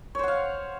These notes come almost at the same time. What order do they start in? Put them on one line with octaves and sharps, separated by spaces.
C#5 C5 F#5 F5